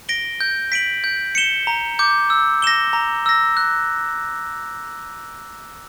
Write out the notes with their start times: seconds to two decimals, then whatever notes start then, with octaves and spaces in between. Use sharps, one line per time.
0.09 A#6 D7 G7
0.41 G6
0.72 B6 D7 F#7
1.04 G6
1.35 C#7 E7 G7
1.67 A#5
1.99 D6 G6
2.30 E6
2.62 A#6 E7 G7
2.93 A#5
3.26 E6 A#6
3.57 F#6